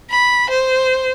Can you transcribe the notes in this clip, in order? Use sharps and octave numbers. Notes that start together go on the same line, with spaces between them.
B5
C5